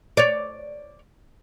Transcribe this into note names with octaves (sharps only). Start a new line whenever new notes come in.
C#5 D5